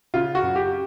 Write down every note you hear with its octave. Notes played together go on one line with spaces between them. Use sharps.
C#3 F4
F#4
F#2
G4